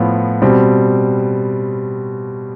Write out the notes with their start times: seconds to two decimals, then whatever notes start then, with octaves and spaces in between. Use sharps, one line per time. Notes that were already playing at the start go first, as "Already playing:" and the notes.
Already playing: A2 F3 B3 F4
0.42 B2 G3 C4